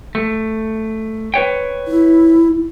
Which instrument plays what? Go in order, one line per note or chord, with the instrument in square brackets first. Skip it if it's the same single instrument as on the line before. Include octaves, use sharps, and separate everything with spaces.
[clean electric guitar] A3
B4 C#5 G5
[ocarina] E4